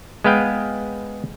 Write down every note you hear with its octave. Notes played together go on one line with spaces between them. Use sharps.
G#3 B3 B4 F5 G5